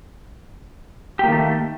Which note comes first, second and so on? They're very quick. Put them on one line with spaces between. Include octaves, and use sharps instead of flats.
G4 A#3 D#3 A3